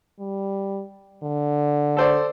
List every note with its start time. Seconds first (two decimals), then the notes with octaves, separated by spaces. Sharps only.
0.19 G3
1.23 D3
1.97 A4 C5 D5